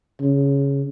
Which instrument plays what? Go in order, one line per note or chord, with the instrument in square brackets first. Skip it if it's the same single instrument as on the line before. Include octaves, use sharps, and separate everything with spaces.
[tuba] C#3